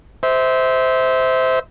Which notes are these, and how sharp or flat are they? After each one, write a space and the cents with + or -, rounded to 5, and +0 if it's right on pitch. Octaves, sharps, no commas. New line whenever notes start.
C5 -15 E5 -30